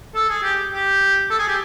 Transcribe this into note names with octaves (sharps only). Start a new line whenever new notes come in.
A4
G#4
G4
G4
A4
G#4
G4